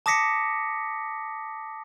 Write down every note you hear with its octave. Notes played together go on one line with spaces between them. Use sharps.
A5 D6 D#6 A#6 B6 C#7